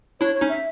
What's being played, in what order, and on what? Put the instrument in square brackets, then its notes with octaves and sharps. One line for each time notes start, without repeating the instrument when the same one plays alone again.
[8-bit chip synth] D4 E4 [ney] C#5
[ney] C#5
[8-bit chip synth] C#4 D#4
[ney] E5